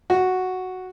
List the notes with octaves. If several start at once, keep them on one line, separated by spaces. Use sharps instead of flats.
F#4